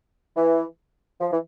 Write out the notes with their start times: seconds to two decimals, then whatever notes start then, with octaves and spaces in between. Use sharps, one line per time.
0.36 E3
1.20 F3
1.32 E3